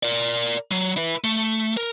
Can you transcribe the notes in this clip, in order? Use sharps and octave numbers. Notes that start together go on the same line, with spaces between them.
A#4 D5
F#3
E4 B4
A3
A#4